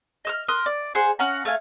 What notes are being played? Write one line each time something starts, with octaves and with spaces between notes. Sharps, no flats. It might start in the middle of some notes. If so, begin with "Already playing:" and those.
D#5 E6 F6
A#4 C6 D#6 F#6
D5
G#4 C5 F#5
C#4 F5 F#5 A#5
A3 F5 G#5